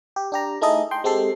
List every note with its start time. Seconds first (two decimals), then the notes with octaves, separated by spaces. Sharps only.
0.16 G4
0.32 D4 G4 A#5
0.61 A3 D#4 E4 G#4 A4 D#5
0.91 G5 C6
1.04 G#3 C4 G4 A4 C7